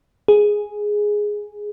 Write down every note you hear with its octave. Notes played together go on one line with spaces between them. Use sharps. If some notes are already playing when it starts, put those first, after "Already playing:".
G#4